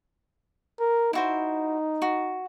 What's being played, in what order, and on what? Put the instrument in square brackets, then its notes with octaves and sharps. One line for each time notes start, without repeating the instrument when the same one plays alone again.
[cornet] A#4
[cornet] D#4 [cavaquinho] E4 F#4 C5
[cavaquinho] F#4